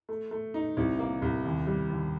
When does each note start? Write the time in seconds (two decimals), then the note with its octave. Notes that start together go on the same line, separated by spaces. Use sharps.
0.09 A3
0.31 A3
0.54 D#4
0.77 C2
0.99 A#3
1.22 C2
1.45 D#2
1.67 G3
1.90 D#2